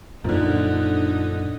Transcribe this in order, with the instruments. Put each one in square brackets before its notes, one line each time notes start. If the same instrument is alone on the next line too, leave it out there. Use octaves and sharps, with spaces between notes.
[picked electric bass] F#2 A#2 [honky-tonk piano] D3 F3 [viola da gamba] D#4